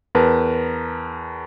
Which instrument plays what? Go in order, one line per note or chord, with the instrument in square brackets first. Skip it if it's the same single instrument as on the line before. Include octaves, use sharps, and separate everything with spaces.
[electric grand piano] E2 A#4 B4 A5 A#5